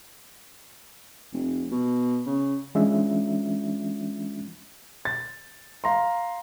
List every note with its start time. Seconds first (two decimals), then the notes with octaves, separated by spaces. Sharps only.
1.33 F1
1.71 B2
2.26 C#3
2.75 E3 G#3 C#4 D4 F4 E5
5.05 A6
5.84 F5 A#5 C6